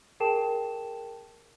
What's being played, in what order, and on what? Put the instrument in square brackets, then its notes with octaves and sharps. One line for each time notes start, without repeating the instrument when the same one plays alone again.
[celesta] G#4 A#4 G5 A5 E7